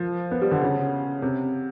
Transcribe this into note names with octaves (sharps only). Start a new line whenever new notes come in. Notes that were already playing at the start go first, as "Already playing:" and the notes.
Already playing: F3
B3
G3
D3
C#3
C3